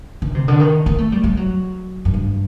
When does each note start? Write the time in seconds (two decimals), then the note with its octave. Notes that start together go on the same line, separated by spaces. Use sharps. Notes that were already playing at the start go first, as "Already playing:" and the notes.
0.22 D#3
0.35 C3
0.48 D3
0.60 D#3
0.86 A#3
0.98 A3
1.12 G3
1.24 G3
1.37 F#3
2.05 F#2
2.14 G2